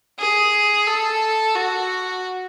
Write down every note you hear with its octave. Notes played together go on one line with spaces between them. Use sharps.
G#4
A4
F#4